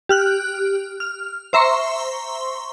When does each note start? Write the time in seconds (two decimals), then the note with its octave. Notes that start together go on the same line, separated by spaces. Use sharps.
0.09 G4 F6 F#6
1.00 F6
1.53 C5 E5 A#5 C6 C#6